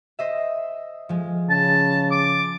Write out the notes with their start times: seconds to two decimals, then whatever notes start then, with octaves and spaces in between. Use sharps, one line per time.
0.19 C5 D#5 E5
1.09 F3 G#3
1.50 C#3 A5
2.11 D6